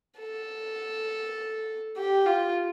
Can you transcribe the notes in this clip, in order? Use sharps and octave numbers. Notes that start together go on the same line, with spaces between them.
A4
G4
F4